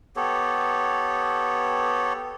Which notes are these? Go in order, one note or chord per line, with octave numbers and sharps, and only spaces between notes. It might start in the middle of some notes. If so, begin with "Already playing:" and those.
B3 G4 A4 C#5